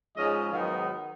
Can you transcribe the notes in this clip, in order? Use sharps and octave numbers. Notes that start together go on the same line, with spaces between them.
G#2 F3 G#3 C#4 D#5
G#2 D#3 F#3 B3 D#4 F5